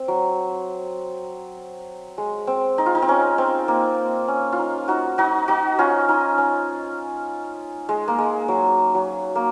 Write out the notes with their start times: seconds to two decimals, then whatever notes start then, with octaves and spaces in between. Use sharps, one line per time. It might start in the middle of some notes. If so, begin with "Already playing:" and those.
Already playing: C4
0.08 F#3
2.18 G#3
2.47 C4
2.78 D#4
2.86 F4
2.95 D#4
3.02 C4
3.09 C#4
3.38 C4
3.68 A#3
4.28 C#4
4.52 F4
4.59 D#4
4.88 D#4 F#4
5.18 D#4 F#4
5.48 D#4 F#4
5.79 C#4 F4
6.09 D#4
6.38 C#4
7.89 G#3
8.08 A#3
8.19 G#3
8.48 F#3
8.95 F#3
9.35 A#3